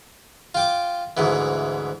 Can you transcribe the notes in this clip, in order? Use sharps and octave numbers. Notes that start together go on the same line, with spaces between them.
F4 G5 D6
D2 G#2 E3